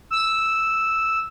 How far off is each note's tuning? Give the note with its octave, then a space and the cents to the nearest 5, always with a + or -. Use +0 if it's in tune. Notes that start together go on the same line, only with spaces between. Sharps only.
E6 -5